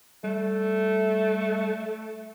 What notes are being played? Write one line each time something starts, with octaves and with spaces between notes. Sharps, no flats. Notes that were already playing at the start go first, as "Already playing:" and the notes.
G3 A3